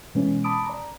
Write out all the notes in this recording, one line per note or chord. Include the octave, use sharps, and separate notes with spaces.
B2 E3 G#3 C#4
A5 B5 D6 D#6 D7
D5 A#5